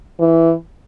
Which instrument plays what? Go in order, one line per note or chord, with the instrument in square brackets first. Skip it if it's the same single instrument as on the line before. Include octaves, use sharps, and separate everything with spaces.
[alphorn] E3